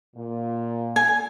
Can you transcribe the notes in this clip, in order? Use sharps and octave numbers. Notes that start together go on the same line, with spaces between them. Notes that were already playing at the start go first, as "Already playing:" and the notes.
A#2
G#5